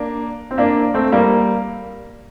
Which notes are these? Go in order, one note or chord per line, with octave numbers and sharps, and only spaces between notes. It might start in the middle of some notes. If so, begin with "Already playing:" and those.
Already playing: A#3 D4
C4
A#3 D4
A3 C4
G3 A#3